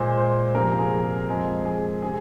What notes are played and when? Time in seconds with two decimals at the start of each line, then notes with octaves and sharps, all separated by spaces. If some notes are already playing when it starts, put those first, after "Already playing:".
Already playing: A#2 G#3 C5
0.17 C5
0.55 F2 C3 F3 A#3 A#4
0.79 G#4
1.04 G#4
1.29 F2 F3 G#3 G#4
1.65 G#4
2.02 C3 G#4